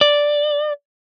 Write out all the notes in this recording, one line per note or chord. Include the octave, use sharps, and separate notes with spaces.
D5